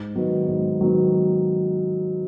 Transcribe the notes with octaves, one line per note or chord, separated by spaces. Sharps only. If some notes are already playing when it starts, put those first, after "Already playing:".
Already playing: G#2
D#3 F#3 B3 D#4
G#2
D#3 F#3 B3 D#4